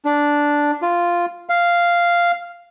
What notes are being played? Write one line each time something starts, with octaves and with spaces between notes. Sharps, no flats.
D4
F4
F5